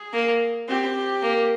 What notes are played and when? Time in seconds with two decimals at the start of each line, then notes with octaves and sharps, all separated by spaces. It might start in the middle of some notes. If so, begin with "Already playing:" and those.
Already playing: G#4
0.13 A#3
0.68 C4 G4
1.23 A#3